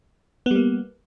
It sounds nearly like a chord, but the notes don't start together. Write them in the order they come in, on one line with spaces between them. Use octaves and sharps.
B3 G3 A#3